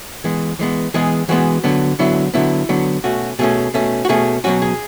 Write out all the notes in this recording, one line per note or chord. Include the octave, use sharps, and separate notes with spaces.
E3 G#3 B3
E3 G#3 B3
E3 G#3 B3 G#4
E3 G#3 B3 F#4
D3 F#3 B3
D3 F#3 B3 E4
D3 F#3 B3 E4
D3 F#3 B3
B2 A3 C#4 F#4
B2 A3 C#4 G#4
B2 A3 C#4
F#4
B2 A3 C#4 G#4
B2 F#3 C#4 F#4
G#4